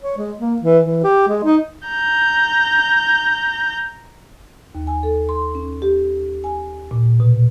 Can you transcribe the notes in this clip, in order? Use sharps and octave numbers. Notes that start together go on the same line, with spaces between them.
C#5
G#3
A#3
E3
E3
G4
G#3
D#4
A#5 G6
D#2
G#5
A4
C6
C#4
G4
G#5
A#2
B2